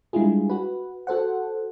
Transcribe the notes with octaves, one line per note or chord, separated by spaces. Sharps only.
G3 G#3 D4 E4 F4 G#4
F#4 B4
F#4 A4 C5 F#5